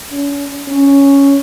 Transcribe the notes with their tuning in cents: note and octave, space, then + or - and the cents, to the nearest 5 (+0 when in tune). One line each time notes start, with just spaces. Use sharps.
C#4 +40
C#4 +5